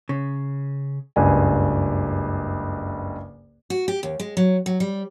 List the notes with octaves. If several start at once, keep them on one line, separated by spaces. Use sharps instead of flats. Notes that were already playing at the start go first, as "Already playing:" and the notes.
C#3
F#1 C#2 G2 G#5
F#4
G4
D#2
G#3
F#3
F#3
G3